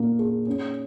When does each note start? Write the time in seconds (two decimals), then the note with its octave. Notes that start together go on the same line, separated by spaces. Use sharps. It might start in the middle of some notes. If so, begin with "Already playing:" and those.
Already playing: A#2 A#3 D#4
0.19 G#4
0.47 C#4